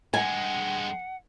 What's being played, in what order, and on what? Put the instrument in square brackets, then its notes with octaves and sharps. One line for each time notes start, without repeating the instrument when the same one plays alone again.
[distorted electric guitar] G2 G#3 [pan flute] F#5 [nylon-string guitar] G#5